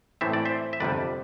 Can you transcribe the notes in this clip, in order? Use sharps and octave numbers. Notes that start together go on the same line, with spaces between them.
A2 E3 A3 C4 E5
D5
C5 E5
E5
G1 F2 C3 G3 B4 D5